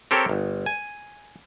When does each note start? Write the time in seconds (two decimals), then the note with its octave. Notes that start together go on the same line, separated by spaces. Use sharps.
0.11 C4 G4 A4 A#4 C#5 G5
0.29 G1
0.66 G#5